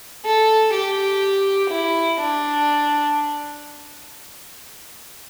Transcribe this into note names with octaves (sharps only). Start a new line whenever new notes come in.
A4
G4
E4
D4